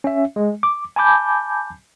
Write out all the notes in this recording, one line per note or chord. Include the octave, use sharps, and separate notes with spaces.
C#4 E5
G#3
D6
G#5 A5 B5 D6 G6